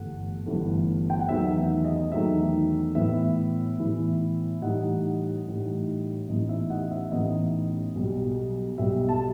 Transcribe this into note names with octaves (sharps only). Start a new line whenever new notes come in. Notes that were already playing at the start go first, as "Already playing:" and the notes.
Already playing: G1 G2 E3 A3 F#5
G1 G2 E3 A3
G5
F#5
E2 D#3 F#3 A3 D#4 E5
E5
D#5
E2 D#3 F#3 A3 D#4 E5
A2 E3 B3 E4 E5
A2 E3 B3 E4
A2 E3 G3 D#4 D#5 F#5
A2 E3 G3 D#4
A1 A2 E3 B3 D#4 D#5
E5
D#5 F#5
E5
A1 A2 E3 B3 D#4 D#5
B1 B2 G3
B1 B2 G3 E5
A5